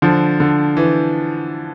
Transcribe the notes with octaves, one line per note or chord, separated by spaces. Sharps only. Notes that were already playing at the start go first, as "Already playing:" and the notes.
D3 F3
D3
E3